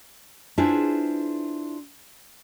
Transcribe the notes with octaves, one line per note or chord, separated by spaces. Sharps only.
D4 E4 F4 G#4 B4 C5